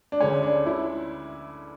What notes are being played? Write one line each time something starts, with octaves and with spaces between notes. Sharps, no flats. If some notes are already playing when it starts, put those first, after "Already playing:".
D4
D2 D3 G#3 C#4
D4
E4